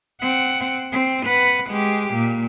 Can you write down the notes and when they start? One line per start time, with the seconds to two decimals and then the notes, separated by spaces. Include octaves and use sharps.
0.21 C4 F#5
0.92 C4
1.26 B4 F#5
1.70 G#3 G4
2.13 A#2